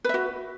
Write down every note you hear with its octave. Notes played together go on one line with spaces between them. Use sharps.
F#4 B4 E5